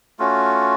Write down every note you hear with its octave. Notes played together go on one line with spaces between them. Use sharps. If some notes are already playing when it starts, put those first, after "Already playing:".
A3 C#4 F4 F#4